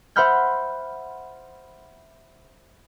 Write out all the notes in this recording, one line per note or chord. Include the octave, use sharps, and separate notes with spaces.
C5 E5 F#5 B5 F6 G6